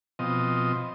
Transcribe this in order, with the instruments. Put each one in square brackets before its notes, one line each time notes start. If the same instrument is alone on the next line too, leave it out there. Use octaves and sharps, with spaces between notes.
[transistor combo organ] B2 F3 C4 D#5